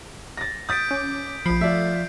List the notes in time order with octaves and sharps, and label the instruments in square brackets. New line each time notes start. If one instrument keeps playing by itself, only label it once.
[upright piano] A6 A#6
[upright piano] D#6 A6 [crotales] G6 B6 D7
[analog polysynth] C#4 D6
[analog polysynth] A#1 B5 [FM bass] F3 [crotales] C7 D7
[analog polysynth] A3 [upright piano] F4 D5 E5